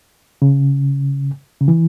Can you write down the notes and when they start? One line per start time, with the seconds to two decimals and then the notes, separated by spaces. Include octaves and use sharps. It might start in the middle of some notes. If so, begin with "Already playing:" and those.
0.42 C#3
1.61 C#3
1.68 E3